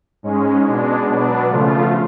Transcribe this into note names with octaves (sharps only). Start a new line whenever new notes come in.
G#2 G#3 C#4
B2 G#3 D4
B2 F#3 B3 D4
C#3 F3 A3 F4